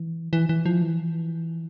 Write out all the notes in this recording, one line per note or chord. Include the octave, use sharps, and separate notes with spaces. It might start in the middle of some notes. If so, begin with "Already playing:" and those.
Already playing: E3
E3
E3
F3
E3